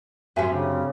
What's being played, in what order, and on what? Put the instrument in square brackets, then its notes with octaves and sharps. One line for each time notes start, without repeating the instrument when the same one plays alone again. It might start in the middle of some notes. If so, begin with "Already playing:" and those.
[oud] F#2 C3 [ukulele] A#4 E5 G#5
[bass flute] C#3 [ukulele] D4